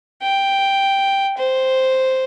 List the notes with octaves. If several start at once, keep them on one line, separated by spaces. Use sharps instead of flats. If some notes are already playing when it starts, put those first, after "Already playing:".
G5
C5